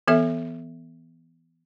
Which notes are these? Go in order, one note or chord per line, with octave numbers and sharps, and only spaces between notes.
E3 B3 A4 E5